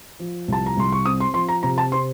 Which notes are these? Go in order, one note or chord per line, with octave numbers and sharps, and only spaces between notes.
F3
C2 A5
A#5
C2 C6
C#6
C4 D#6
C6
F3 C6
A#5
C3 A#5
A5
C4 C6